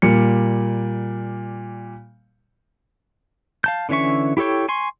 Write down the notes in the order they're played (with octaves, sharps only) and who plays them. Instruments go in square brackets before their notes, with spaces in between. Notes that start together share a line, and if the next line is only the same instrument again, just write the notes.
[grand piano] A#2 G3 C#7
[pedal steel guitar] F5 A5 G6
D3 E3 C#4 E5 C#6
E4 G4 A4 C#5 G5
G#5 C6 C#6